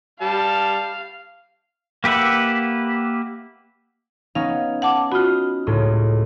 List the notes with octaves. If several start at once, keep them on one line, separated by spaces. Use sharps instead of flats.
G3 F5 A5
A#3 G4 B4 E5 F#5
B3 C#4 D#4 F5
F#5 A5 D6
F4 F#4 B5 D#6 F6
C#2 A2